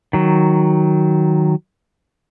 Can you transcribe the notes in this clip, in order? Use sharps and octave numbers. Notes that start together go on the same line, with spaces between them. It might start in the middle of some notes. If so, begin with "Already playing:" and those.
D#3 F#3